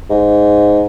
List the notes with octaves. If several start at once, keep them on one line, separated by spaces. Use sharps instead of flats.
G#2